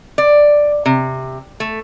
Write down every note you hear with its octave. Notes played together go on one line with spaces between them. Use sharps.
D5
C3
A3